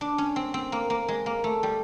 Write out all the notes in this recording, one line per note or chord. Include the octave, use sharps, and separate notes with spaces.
D4
C#4
C4
C4
A#3
A#3
G#3
A#3
A3
G3